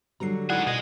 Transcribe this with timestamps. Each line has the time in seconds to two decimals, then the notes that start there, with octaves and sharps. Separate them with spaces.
0.20 D3 F#3 G3 A#5 C7
0.50 G#2 E4 F#4 G#4 D5 F#5
0.67 B2 G#4 D#5